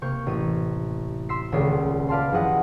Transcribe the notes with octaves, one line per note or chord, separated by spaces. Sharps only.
C3 A#3 C#6 G6
A1 D#7
C6 E6 B6 C7
D#1 C#2 A3 C#5 D#6 C7
B4 D5 F5 A5 C6
F#1 F3 G3 E4 D#5 F#5